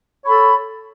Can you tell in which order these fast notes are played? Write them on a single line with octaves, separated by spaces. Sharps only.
C#5 B5 A4